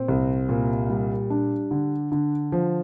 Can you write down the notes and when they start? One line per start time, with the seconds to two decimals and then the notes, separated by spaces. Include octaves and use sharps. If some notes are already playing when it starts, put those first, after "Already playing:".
Already playing: A#2 C4
0.08 C2
0.49 A#2
0.90 G3
1.30 D4
1.71 D3
2.12 D3
2.52 F3